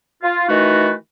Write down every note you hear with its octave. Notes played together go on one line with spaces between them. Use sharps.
F4
D#3 E3 A3 D#4 F#4 B4